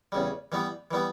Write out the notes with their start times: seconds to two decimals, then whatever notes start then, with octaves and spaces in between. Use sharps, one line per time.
0.12 E2 C#3 G3
0.52 E3 G3 B3
0.91 E3 G3 B3